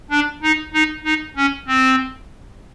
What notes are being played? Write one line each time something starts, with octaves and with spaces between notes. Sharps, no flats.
D4
D#4
D#4
D#4
C#4
C4